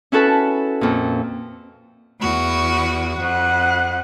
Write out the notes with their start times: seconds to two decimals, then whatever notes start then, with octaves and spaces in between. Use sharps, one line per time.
0.12 C#4 E4 F#4 A4 B4
0.81 F2 A#2
2.19 E2 F#4
3.18 F2 F#5 F#6